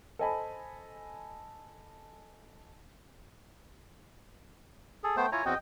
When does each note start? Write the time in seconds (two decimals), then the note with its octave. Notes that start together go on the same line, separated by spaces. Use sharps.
0.19 A4 C5 D#5 G#5 A5 B5
5.04 G#4 A4
5.17 A3 B3 C5 G5
5.32 E4 F4 C#5 G#5 A#5
5.46 E2 C4 F#4 D#5 G5